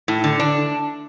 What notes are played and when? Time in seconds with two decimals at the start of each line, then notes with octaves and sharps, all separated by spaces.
0.08 A2
0.24 D3
0.40 D4